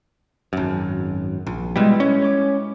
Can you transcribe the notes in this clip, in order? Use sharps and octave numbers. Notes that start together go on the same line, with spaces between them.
G#1 F#2
A#1
B2 G3 G#3 E4
C#4
C#5 D6